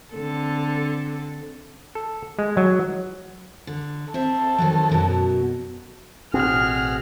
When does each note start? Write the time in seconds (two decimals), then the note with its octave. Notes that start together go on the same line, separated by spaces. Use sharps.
0.14 D3 C4 A4
1.95 A4
2.39 G#3
2.57 F#3
3.67 D3
4.14 C4 A4 C5 E5
4.58 D#3 F3 F#3
4.89 F#2 B2 F#3
6.34 A1 B2 C4 F#4 G#4 F6